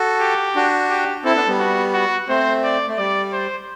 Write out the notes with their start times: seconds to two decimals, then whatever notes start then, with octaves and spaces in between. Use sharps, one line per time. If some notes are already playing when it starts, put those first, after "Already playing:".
Already playing: F#4 A4
0.20 G4
0.55 D4 F#4
0.90 G4
1.24 C4 E4 A4
1.36 B3 D4
1.48 G3 B3
1.59 F#4
1.94 F#4
2.28 A3 C4 C5
2.64 D5
2.88 A3
2.98 G3 D5
3.33 C5